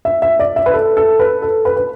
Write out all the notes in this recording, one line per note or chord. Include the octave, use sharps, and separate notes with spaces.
E5
E5
D5
E5
B4
A4
A4
B4
A4
B4
B4